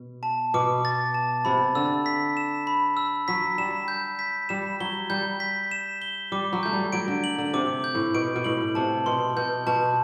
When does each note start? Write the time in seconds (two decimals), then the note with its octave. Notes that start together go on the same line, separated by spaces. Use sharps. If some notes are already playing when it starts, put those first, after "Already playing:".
Already playing: B2
0.23 A5
0.54 B2 D6
0.85 A6
1.14 A5
1.45 C3 B5
1.75 D3 E6
2.06 B6
2.37 E7
2.67 B5
2.97 E6
3.28 F#3 B6
3.58 G3 E7
3.88 G6
4.19 B6
4.49 G3 E7
4.80 F#3 G7
5.10 G3 G6
5.40 B6
5.71 E7
6.02 G7
6.32 G3 D6
6.53 F#3
6.63 A3 G6
6.73 G3
6.93 F#3 D7
7.08 D3
7.24 F#7
7.38 D3
7.53 C3 D6
7.84 G6
7.95 A2
8.14 B2 D7
8.36 B2
8.45 A2 F#7
8.75 C3 A5
9.06 B2 C6
9.37 B2 G6
9.67 B2 A5